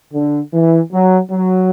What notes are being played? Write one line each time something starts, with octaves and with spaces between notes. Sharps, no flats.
D3
E3
F#3
F#3